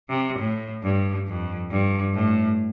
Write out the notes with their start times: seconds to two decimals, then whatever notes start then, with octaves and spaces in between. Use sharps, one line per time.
0.09 C3
0.39 A2
0.83 G2
1.27 F2
1.71 G2
2.15 A2